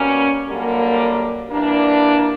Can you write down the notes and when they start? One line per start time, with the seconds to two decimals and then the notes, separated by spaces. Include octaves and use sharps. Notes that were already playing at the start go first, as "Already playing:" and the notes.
Already playing: B2 G3 A#3 C#4
0.48 F#2 D3 G3 A#3
1.51 E3 G3 A#3 D4